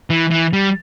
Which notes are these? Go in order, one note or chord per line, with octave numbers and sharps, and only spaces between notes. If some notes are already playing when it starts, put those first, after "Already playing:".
E3
E3
G3